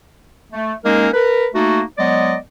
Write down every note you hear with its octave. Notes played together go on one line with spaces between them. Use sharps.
A3
G#3 A#3 C#4 D#4 A#4
A#4 B4
A3 A#3 D#4 F#4
F#3 G#3 B3 D5 D#5